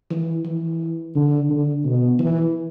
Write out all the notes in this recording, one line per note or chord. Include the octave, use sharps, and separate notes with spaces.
E3
E3
D3
D3
B2
E3